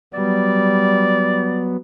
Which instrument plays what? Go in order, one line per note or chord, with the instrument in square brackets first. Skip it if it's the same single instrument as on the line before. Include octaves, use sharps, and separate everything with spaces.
[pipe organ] F#3 B3 [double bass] G3 [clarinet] D5